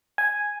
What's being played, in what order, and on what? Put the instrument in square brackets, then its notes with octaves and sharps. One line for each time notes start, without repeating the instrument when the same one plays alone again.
[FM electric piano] G#5